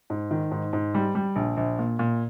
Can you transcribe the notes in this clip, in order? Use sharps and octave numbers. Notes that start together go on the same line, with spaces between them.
G#2
D#3
G#2
G#2
G3
G3
A#1
A#1
A#2
A#2